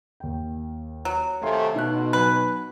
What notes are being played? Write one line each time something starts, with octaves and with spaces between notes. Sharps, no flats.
D#2 G5
F#3
C3 D#3 A3 F5 G#5 C6
B2 D#4 F#6
F#3 B4 G#5